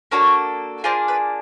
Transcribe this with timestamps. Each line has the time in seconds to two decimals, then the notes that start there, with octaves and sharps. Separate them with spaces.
0.11 A#3 D4 F#4 A4 C#5
0.84 A#3 D4 F4 G#4 C5
1.08 B4